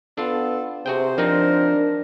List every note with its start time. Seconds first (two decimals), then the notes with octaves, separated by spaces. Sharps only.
0.18 B3 D4 F4 A4
0.86 C3 F#4 G#4 C5 G5
1.18 F3 C4 D4 D#4 A#4